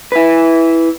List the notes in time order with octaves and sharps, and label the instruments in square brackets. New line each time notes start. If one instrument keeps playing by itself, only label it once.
[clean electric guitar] E4 B4